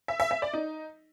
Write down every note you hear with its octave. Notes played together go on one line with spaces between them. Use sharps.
E5
E5
E5
D5
D#4